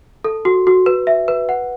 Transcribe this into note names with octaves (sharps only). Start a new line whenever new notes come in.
A4
F#4
F#4
B4
E5
B4
F#5